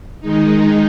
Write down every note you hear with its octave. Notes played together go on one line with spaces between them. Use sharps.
D#3 G#3 D#4